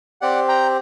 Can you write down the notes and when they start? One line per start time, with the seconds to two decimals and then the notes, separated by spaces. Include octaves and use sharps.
0.21 C4 G4 D5 F#5
0.48 G5 A#5